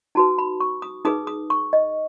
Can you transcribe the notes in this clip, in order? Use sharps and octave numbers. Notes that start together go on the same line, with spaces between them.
D#4 F#4 B4 A5
B5
C#6
D#6
D#4 G#4 B4 D#6
D#6
C#6
D#5